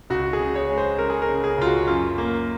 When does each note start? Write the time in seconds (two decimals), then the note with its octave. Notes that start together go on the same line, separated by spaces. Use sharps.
0.10 C#2 F#4
0.33 G#4
0.39 C#3
0.55 C#5
0.70 G#3
0.78 C5
0.99 C#3 A#4
1.10 G#4
1.22 A#4
1.29 C#3
1.44 G#4
1.58 C#2 F4
1.65 F#4
1.87 F#2 F4
2.18 A#3